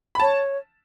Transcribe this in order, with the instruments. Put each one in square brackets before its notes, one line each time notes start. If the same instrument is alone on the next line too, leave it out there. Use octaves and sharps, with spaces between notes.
[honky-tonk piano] B5
[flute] C#5 [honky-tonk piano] A5